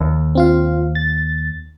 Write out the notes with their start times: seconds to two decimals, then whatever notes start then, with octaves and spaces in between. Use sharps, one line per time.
0.01 D#2
0.35 C4 F4 F5
0.95 A6